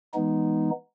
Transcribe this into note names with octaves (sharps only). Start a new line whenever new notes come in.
E3 G#3 B3 D#4